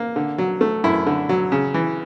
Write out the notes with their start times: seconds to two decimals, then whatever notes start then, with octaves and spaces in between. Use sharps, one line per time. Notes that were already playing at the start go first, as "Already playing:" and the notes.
Already playing: A#3
0.16 D3
0.38 F#3
0.61 A3
0.84 F#2 E4
1.06 D3
1.29 F#3
1.52 C#3
1.74 E3